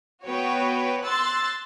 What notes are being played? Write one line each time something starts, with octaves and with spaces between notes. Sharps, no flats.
B3 F#4 B4 C#5 G5
C6 E6 F#6 A6